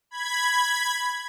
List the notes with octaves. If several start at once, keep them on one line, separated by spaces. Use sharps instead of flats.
B5 G#6